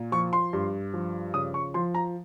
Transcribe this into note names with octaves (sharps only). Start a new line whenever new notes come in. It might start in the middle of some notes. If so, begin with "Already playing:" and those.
Already playing: A#2
F3 C#6
C6
G2
F3
C#3 D#6
C#6
F3 C6
A#5